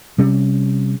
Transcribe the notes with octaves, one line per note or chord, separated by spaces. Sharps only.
C3 G3 C#4